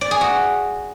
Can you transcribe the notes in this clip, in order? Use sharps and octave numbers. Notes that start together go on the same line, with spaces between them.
D5
G#4
F#4